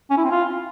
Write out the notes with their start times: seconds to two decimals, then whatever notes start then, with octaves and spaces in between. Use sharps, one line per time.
0.10 C#4
0.17 E4
0.24 C4
0.31 F4